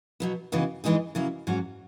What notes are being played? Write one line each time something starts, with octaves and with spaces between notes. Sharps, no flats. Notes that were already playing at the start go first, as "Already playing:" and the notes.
B2 F#3 B3
C#3 E3 B3 D#4 F#4
G#2 E3 G#3 D#4 G#4
C#3 F#3 A#3 E4
G#2 F#3 C#4 F#4